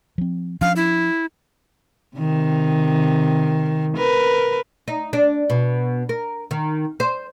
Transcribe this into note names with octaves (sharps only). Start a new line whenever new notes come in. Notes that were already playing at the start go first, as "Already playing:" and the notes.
F3 C4
F3 C#4 D4 F5
E4
C3 D#3
A#4 B4
D#4
D4
B2
A#4
D#3
C5